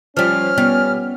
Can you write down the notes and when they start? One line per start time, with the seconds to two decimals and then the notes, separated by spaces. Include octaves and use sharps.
0.17 F3 G3 C#4 F6
0.58 G3 B3